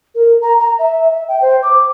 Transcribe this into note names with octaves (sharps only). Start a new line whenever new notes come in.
A#4
A#5
A#5
E5
E5
G5
C5
D6